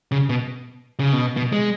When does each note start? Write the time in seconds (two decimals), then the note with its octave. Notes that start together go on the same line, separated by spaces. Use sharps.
0.12 C#3
0.29 B2
0.99 C#3
1.13 B2
1.37 B2
1.53 G#3